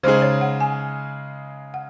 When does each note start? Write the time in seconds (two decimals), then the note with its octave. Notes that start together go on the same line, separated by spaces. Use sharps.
0.03 C#3 G#3 D#4 G#4 C5
0.22 C#5
0.41 F#5
0.60 G#5
1.74 F#5